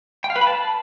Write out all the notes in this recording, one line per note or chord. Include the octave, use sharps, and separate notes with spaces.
G5
F5
B4
B5
A5